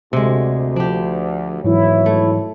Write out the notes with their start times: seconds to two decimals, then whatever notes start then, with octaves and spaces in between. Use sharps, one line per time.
0.13 D2 C3 G#3
0.76 F3 D4 G4
1.64 G#1 G#2 B2 E3 F#3 E4 C#5
2.06 A3